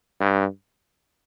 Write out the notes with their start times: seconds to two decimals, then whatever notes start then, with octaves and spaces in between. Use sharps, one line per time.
0.21 G2